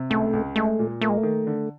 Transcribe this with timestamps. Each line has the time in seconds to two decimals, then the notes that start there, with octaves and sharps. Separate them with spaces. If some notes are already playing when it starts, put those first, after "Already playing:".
Already playing: C3
0.10 C#2 A3
0.33 C#2
0.56 G#3 A3
0.79 A#2
1.01 A3 A#3
1.09 G#3
1.18 A3
1.23 D#3
1.47 D3